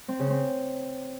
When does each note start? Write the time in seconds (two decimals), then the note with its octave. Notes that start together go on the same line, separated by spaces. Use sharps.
0.08 C4
0.19 C#3
0.30 C4